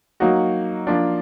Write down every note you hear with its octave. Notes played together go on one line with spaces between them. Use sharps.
F#3 A#3 D#4 F#4
F3 A#3 D4 F4